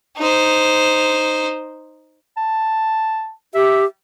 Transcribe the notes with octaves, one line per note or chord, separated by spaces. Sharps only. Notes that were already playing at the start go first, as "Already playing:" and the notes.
D#4 C5
A5
G4 E5